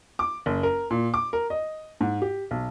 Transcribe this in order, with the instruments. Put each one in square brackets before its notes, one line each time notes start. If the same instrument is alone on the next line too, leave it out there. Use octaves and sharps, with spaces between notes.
[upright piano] D6
F#1
A#4
A#2
D6
A#4
D#5
G#2
G4
B1